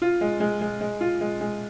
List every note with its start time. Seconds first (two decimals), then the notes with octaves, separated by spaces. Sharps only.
0.02 F4
0.21 G#3
0.40 G#3
0.61 G#3
0.81 G#3
1.01 F4
1.21 G#3
1.41 G#3